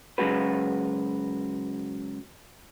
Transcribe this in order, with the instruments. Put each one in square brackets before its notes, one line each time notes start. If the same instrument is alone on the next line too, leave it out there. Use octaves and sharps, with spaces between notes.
[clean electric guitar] C#3 F#3 G#3 F#4 B4